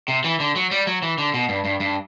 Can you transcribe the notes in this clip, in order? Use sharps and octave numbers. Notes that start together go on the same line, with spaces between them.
C3
E3
D3
F#3
G3
F#3
E3
D3
B2
G2
G2
G2